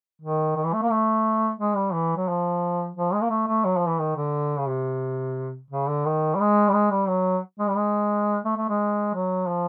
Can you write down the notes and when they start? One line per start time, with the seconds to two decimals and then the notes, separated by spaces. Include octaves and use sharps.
0.21 D#3
0.56 D#3
0.64 E3
0.73 A3
0.82 A#3
0.90 A3
1.59 G#3
1.76 G3
1.93 E3
2.16 F#3
2.28 F3
2.97 F3
3.13 G#3
3.22 A#3
3.30 A3
3.48 A3
3.65 F#3
3.77 F3
3.88 E3
3.99 D#3
4.16 D3
4.57 C#3
4.68 C3
5.70 C#3
5.88 D3
6.05 D#3
6.35 G3
6.40 G#3
6.68 G3
6.73 G#3
6.91 G3
7.08 F#3
7.59 G#3
7.69 G3
7.77 G#3
8.45 A3
8.57 A3
8.69 G#3
9.14 F#3
9.48 F3